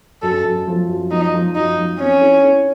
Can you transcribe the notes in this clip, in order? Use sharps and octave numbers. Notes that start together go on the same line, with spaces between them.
F#2 A4
F#2
F3
F#2
F3 D#4
F3
F#2 D#4
F3
C4 C#4
E4
E4